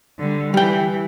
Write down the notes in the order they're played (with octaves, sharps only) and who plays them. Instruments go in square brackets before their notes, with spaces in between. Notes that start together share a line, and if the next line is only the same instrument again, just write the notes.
[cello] D3 G3
[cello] E3 [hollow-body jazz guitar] G3 G5